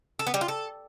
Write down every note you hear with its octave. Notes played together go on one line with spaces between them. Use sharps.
A4
B3
G3
F4
A4